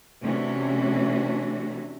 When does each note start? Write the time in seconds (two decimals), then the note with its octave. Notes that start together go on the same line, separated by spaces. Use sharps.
0.23 C3 E3 A3 C#4 D4 F#4